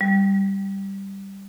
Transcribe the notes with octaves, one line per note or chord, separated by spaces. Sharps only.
G3